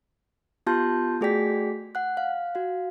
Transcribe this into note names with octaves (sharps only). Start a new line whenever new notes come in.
B3 F4 G4 A5 C6 G6
A3 F#4 G#4 D5 G5 B6
F#5 F#6
F5
F#4 F5